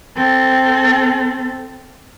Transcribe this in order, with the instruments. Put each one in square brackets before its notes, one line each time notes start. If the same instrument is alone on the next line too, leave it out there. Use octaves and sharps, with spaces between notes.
[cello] C4 A4